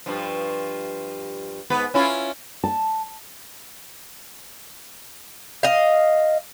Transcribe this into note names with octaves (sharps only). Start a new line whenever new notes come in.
G2 F3
G#2 B3 B4
C#4 E4 F4
A5
D#5 F5